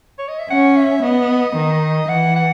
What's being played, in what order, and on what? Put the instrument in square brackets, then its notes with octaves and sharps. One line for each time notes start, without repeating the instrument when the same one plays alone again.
[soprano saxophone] C#5
D#5
E5
[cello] C#4 [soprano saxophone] F#5
[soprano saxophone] E5
[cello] B3 [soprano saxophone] D#5
[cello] D#3
[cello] E3 [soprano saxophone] F#5
[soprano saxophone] F#5